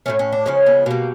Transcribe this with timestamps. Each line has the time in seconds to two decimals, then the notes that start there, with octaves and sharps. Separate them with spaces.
0.06 A2 F3 A3 C#4
0.19 C#4
0.32 D4
0.46 C#3 F3 G#3 C#4
0.66 B3
0.86 B2 G3 A#3